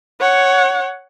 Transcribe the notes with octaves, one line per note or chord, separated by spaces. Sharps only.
C#5 F#5